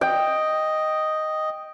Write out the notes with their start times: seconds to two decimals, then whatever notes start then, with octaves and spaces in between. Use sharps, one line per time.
0.01 D#5 G5